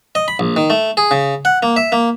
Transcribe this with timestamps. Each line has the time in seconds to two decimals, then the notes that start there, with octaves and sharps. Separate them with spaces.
0.15 D#5
0.28 B5
0.39 A#1
0.56 D#3
0.70 A3
0.97 G#4
1.11 C#3
1.45 F#5
1.63 A#3
1.76 E5
1.92 A#3